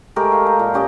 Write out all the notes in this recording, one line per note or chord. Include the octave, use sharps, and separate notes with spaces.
G#3 A3 G4 A#4
F5
A#5
A#2
C#4 G4 D#5 G5